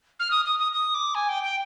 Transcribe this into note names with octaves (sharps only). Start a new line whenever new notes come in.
F6
D#6
D#6
D#6
D#6
D6
G#5
G5
G5